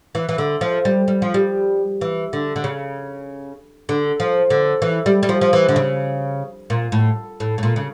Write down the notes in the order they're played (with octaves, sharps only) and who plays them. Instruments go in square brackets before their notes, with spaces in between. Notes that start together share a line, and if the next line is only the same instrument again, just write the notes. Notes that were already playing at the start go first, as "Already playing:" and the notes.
[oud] E3
E3
D3
F3
G3
G3
F3
G3
E3
D3
D3
C#3
D3
F3
D3
E3
G3
G3
F3
F3
E3
D3
C#3
A#2
A2
A2
A2
A#2
C#3